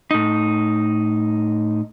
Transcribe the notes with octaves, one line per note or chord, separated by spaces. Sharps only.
A2 D#4